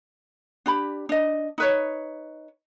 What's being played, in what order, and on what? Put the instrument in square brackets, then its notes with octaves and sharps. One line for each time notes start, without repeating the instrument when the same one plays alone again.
[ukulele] D4 G4 B5
D4 D#5
D#4 B4 C#5